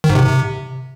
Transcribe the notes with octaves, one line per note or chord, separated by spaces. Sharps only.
D#3
G#2
C3